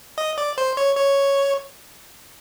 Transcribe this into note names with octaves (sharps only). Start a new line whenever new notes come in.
D#5
D5
C5
C#5
C#5